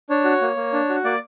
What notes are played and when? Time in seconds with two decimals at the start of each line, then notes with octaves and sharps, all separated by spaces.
0.10 D4 C#5
0.25 F#4
0.42 A#3
0.56 A#3
0.73 D4
0.89 F#4
1.04 A#3 D5